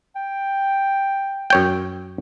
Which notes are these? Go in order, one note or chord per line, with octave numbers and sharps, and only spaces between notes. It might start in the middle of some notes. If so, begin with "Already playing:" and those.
G5
F#2 C#5 G5